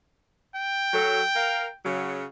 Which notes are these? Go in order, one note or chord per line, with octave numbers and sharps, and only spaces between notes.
G5
F#3 A4
A#4 F5
C#3 F#3